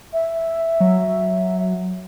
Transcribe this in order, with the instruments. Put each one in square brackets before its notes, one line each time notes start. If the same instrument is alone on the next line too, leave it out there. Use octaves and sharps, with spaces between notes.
[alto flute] E5
[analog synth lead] F#3